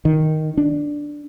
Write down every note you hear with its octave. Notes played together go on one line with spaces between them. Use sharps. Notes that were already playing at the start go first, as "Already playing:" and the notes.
D#3
D4